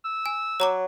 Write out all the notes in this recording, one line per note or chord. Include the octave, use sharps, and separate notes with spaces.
E6
G#5
F#3 C#5 A#5 D6